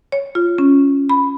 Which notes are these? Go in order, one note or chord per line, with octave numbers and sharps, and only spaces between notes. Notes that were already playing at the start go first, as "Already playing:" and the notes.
C#5
F4
C#4
B5